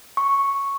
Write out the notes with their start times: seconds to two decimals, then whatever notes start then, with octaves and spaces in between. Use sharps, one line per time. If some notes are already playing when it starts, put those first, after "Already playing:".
0.17 C#6